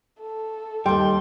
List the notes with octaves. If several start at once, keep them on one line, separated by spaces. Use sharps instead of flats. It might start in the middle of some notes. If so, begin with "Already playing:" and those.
A4
D#2 G3 G5 C6